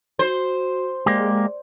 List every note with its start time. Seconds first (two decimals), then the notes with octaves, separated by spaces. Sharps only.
0.19 F#4 C5
1.06 G#3 A#3 G4 D5